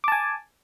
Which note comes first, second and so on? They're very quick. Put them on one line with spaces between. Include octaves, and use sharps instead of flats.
D6 A5 G#5